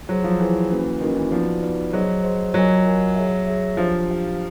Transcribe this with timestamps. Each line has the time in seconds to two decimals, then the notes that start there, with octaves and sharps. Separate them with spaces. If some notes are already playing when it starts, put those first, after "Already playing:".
0.09 F#3 F4 G#4 C5
0.24 F3
0.40 E3 F4 G#4 C5
0.70 A#3 C#4 F#4 B4
1.00 D#3 A#3 C#4 F#4 B4
1.16 E3
1.32 F3 B3 D#4 F#4 B4 D5
1.63 B3 D#4 F#4 B4 D5
1.93 F#3 G#4 C5 D#5
2.24 G#4 C5 D#5
2.54 F#3 F4 A#4 D#5 G#5
2.85 F4 A#4 D#5 G#5
3.16 G#4 C#5 E5
3.47 G#4 C#5 E5
3.77 F3 D4 G4 C5 F5
4.07 D4 G4 C5 F5